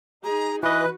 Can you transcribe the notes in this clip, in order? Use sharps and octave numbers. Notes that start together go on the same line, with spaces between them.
D#4 G#4 A#5
E3 F#4 B4 D#5 F#6